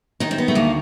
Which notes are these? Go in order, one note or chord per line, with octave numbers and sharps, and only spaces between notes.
D#3 D#4
C4
B3
A3
D2 A#3